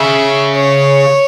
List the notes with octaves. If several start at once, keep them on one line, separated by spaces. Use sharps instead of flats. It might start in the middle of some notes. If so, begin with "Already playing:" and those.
Already playing: C#3 E5
C#5